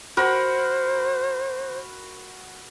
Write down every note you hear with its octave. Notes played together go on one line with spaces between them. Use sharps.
F#4 A#4 C5 B5